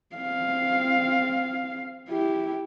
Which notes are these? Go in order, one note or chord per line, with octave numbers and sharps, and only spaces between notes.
C4 F5
E4 G4